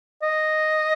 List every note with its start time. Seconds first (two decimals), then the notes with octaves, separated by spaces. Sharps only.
0.22 D#5